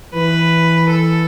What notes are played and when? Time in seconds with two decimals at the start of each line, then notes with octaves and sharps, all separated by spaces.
0.14 E3 B4
0.90 A4